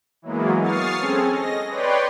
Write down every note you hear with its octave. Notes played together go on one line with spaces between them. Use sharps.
E3 F#3 G#3 A#3 B3
C#6 D#6 F6 A6 C7
C4 C#4 G#4 A4
D#5 A#6
B4 C#5 D5 G5 C6